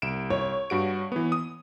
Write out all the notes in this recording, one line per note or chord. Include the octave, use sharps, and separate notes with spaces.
C2 D7 E7
C#5
G2 F#4 D7
E3 B3
D#6